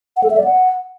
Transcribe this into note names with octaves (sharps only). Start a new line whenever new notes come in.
F#5
A4
E5
D5
F#5